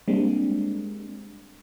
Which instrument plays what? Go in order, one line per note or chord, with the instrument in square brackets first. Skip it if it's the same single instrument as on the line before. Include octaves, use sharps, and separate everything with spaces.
[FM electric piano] G3 G#3 A#3 C4 D4